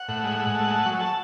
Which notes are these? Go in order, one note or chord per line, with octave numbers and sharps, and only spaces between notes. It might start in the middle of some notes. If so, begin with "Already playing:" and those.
Already playing: F#5
A2
G#3
G#3
A3
A3
F#3
A5